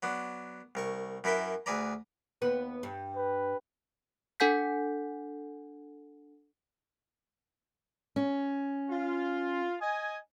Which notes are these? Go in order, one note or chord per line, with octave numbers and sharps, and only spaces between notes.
F#3 B3 D4
C2 A#4 C#6
F#2 E4 A#4 B4 E5 G5
D2 G#4 B4 D5 A#5
D#2 B3 B4
G2
B4
D4 A4 F#5 G#5 G6 B6
C#4
F4
D#5 G#5